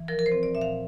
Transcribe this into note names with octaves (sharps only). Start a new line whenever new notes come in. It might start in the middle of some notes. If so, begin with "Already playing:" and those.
Already playing: E3
F3 A#4
A#4
C5
C4
D5
A#2 E5
F5